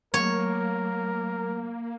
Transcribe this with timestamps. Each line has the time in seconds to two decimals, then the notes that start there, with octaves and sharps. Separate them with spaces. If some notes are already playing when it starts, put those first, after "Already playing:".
0.14 F#3 A3 A#3 A#4 C#5